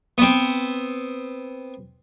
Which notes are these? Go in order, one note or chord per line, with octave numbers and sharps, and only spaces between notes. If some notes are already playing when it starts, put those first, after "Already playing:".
B3 C4